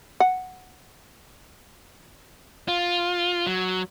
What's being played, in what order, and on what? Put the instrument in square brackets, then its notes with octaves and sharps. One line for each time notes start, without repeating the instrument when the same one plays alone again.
[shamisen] F#5
[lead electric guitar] F4
F#3